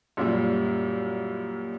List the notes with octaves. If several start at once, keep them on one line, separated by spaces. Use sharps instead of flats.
F#2 A#2 G3